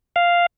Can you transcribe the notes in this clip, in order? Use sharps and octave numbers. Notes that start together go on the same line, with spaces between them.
F5